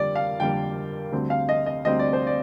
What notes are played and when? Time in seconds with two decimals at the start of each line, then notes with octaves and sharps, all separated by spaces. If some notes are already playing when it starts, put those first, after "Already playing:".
Already playing: F2 D3 G3 A#3 D5
0.16 F5
0.39 F2 D3 G3 A#3 G5
1.12 D2 D3 G3 C4
1.30 F5
1.49 D#5
1.66 D#5
1.85 D2 D3 G3 C4 D#5
1.99 D5
2.13 C5
2.27 D5